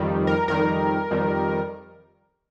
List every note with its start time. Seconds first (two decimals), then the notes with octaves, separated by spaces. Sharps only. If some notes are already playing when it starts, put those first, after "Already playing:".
Already playing: F2 D#3 G3
0.27 A#4
0.48 F2 D#3 G3 A#4
1.11 F2 D#3 G3